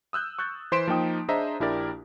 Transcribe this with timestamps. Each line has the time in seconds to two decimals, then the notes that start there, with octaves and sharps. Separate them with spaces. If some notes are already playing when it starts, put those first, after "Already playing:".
0.13 D#6 E6 F#6 G6
0.38 C#6 F#6 G6 A6
0.72 E3 C5 C6 B6 D7 E7
0.87 F3 A#3 D#4 G5 D#6
1.28 D4 G#4 C5 D#5 E5 A#5
1.60 A#1 D4 E4 G4 A#4 D5